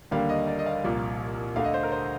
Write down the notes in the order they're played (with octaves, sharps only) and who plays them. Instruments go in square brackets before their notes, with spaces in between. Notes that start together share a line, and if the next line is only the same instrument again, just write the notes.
[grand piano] D#2 D3 G3 A#3 F5
D#5
D5
D#5
F5
C2 A#2 F3 A#3
D2 D3 A3 F5
D#5
C5
A#4
C5